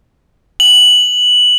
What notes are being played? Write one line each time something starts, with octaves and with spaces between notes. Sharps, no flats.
F#7